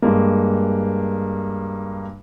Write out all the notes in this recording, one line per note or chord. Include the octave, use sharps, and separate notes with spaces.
G2 G#3 A#3